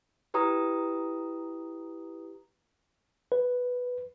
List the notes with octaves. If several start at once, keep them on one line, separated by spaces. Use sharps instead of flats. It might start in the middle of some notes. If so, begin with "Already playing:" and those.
E4 G4 B4 A#5 D#6
B4